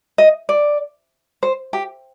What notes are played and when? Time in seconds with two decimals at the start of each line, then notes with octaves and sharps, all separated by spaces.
0.18 D#5
0.49 D5
1.43 C5
1.73 G4